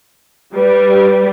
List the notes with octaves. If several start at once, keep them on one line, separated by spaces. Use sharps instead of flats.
G3 B4